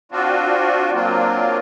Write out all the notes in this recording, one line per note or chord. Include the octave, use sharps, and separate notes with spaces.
C4 D4 F4 F#4
F#3 A#3 C4 D4 F4